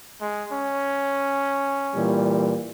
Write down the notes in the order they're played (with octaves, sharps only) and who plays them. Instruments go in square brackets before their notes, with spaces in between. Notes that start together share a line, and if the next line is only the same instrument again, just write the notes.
[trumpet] G#3
C#4
[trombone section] A#2 E3 G3